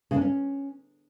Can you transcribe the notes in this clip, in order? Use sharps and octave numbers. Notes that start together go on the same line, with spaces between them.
C#3
D4
C#4